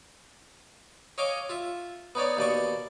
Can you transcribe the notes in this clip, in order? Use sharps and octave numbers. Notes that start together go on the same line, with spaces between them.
C#5 D#5 F5 G#5 D6
F4 E5
B3 D#4 C#5 D5
D#2 B2 D5 C#6